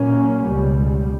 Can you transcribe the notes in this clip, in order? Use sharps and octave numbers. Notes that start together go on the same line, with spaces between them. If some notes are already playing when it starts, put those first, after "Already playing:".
Already playing: A#2 F#3 A#3 C#4
C#2 B2 G3